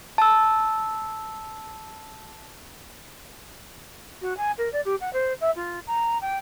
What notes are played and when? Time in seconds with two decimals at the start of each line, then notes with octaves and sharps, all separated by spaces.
0.18 A5 E6
4.21 F#4
4.37 G#5
4.58 A#4
4.73 D5
4.85 G4
5.01 F#5
5.13 C5
5.41 E5
5.56 F4
5.87 A#5
6.21 G5